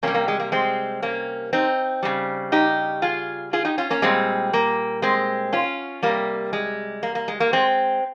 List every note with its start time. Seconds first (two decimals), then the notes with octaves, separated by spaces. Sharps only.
0.03 C3 G3 A#3 C#4
0.14 A#3
0.28 G#3
0.40 A#3
0.52 G#3 C4
1.02 A#3 C#4
1.53 C4 D#4
2.03 C#3 G3
2.52 D#4 G4
3.02 F4 G#4
3.53 F4 G#4
3.65 D#4 G4
3.78 C#4 F4
3.90 A#3 C#4
4.02 A#2 G3 G#3 C4
4.53 A#3
5.02 G#3 C4
5.53 C#4 F4
6.03 C3 G3 A#3
6.53 G#3
7.03 A#3
7.15 A#3
7.28 G#3
7.40 A#3
7.53 G#3 C4